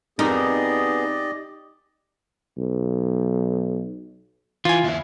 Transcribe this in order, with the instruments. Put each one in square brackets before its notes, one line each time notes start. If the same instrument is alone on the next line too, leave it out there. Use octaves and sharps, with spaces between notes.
[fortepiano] F2 A#4 [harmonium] B3 G#4 [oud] D#4 [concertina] G4 D5 D#5
[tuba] B1
[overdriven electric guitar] E3 [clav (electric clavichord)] F4 G#5
[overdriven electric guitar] D#2 E4